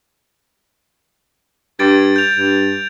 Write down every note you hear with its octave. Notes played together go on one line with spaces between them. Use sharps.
G2 G#6 A6 D7
G6 F7
G2